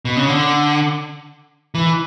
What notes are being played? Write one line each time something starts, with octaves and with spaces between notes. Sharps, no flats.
B2
C#3
D3
E3